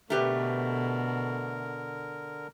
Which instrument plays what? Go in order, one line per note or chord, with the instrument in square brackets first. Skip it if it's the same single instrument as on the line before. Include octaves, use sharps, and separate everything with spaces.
[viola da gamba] B2 [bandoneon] D3 A#4 [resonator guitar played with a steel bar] A3 G4 B4